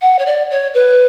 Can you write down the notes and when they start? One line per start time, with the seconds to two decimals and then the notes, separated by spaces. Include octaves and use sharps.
0.02 F#5
0.19 C#5
0.26 D5
0.51 C#5
0.74 B4